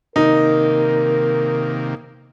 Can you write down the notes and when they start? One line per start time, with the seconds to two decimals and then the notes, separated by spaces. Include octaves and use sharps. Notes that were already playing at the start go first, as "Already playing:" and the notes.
0.16 C3 D#3 A#3 D#4 A#4